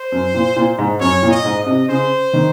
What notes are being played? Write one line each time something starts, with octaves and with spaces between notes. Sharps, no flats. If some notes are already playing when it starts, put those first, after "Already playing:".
Already playing: C5
F#2
A#2
A#2
G#2
F#2 C#5
A#2
D#5
G#2
D#5
C3
C#3 C5
D#3